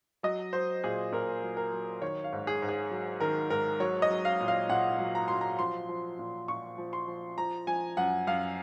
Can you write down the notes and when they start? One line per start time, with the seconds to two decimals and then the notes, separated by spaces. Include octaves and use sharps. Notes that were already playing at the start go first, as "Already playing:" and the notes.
0.23 F#3 D#5
0.53 F#3 C5
0.83 A#2 G#4
1.12 A#2 A#4
1.42 F#3
1.57 A#4
1.72 F#3
2.02 D#3 C#5
2.24 F5
2.32 G#2
2.47 G#4
2.62 G#2
2.69 G#4
2.91 F#3
3.20 D#3 A#4
3.50 G#2 A#4
3.80 F#3 C#5
4.02 D#5
4.10 F#3
4.25 F5
4.41 A#2
4.48 F5
4.69 A#2 F#5
4.99 F#3
5.15 A#5
5.28 F#3 C6
5.41 A#5
5.59 F3 C6
5.89 F3
6.19 A#2
6.48 A#2 C#6
6.78 F3
6.93 C6
7.07 F3
7.38 F3 A#5
7.67 F3 G#5
7.97 F#2 F#5
8.27 F#2 F5